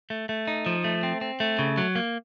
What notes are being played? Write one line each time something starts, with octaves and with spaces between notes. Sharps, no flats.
A3
A3
D#4
F3
A3
C4
C4
A3
C#3
F#3
A#3